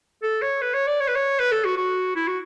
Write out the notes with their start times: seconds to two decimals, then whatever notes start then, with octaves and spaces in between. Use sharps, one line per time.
0.23 A4
0.42 C#5
0.62 B4
0.74 C#5
0.87 D5
1.00 C#5
1.08 B4
1.15 C#5
1.39 B4
1.52 A4
1.65 F#4
1.77 F#4
2.16 E4
2.28 F#4